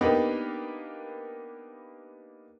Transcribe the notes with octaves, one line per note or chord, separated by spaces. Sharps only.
A#3 B3 D4 D#4 G4 B4